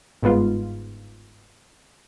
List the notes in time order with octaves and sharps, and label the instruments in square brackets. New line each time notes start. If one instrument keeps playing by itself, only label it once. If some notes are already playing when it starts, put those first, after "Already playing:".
[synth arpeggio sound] G1 G#2 B3 F4